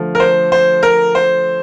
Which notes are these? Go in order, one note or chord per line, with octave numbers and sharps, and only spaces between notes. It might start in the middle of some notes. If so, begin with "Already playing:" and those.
Already playing: D3 F3 A3
A#4
C5
C5
A#4
C5